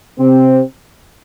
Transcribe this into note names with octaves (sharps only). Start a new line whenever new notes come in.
C3 C4